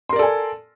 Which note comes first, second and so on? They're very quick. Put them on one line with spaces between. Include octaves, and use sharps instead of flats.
C6 A#4 D5 A4 G#5